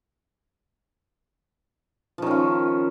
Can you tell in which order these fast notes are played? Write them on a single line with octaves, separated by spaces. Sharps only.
F3 D#3 C#4 F4